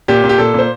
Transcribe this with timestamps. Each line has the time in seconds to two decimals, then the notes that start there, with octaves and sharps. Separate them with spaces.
0.08 A#2 G4
0.24 A#2
0.29 G4
0.38 A#2 A4
0.54 A#2 C5